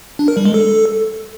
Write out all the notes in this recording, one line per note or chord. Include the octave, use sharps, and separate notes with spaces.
D4
A#4
G3
G#3
A4